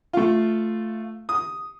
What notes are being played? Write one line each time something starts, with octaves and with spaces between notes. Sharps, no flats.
A3 F4
D#6